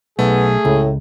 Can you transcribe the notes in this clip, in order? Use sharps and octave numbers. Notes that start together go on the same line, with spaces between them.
B1 A3 B3 G#4
C#2 A2